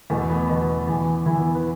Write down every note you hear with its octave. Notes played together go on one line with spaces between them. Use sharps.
E2 B2 A3
B3
E2 B2
E2 E3
E2 E3 E4
B3
B4